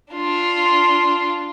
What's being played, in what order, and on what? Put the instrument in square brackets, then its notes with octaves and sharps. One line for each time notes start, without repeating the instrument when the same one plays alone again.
[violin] D4 F4